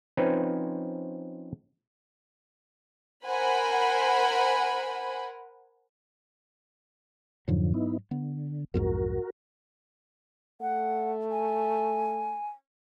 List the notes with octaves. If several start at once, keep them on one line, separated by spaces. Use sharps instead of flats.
F3 C4 C#4 D#4 B4
A#4 C5 F#5 G#5 B5
F2 G#2 D3 F3 F#3
B3 D#4 E4
D3 B3
B1 F2 G#2 F#4 A#4
A3 F#5
G#5